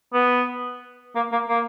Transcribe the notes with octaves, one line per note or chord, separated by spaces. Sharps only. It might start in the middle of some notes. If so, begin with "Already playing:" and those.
B3
A#3
A#3
A#3